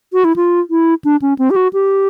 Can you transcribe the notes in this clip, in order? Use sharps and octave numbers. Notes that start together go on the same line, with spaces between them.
F#4
E4
F4
E4
D4
C#4
C4
G4
F#4
G4